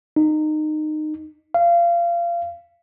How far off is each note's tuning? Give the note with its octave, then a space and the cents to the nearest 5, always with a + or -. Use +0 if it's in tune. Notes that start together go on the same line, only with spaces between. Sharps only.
D#4 -20
F5 -25